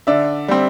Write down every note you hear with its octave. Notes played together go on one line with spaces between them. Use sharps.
D3 D5 E5
G3 C4